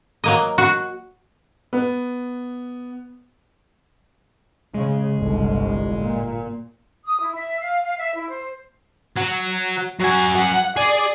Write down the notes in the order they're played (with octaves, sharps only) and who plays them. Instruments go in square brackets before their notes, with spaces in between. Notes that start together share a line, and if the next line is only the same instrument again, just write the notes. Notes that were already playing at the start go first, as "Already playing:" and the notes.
[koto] F#3 A#3 D#5
F#4
[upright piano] B3
[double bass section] C#3 [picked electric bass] G#3
[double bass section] G1 C2
A#2
[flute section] D#6
E4
E5
F5
F5
E5
E4
C5
[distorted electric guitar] F#3
[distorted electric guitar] F#3 G#5 [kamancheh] F#4
[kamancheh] F#5
[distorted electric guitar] G#4 [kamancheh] D5